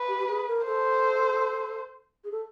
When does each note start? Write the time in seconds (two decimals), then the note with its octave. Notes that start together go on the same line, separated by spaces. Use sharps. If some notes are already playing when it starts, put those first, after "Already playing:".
Already playing: B4
0.08 G4
0.19 G4
0.27 G#4
0.48 A#4
0.67 A4 C5
2.24 G#4
2.32 A4